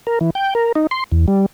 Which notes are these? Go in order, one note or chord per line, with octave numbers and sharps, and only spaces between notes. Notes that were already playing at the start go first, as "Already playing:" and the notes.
A#4
E3
G5
A#4
D#4
C6
E2
G3